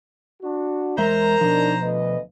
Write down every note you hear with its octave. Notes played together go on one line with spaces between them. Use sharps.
D4 F#4
E2 G#3 A#4 C5 E5 A#5
B2 F3 D4 D#4
D2 B4 D#5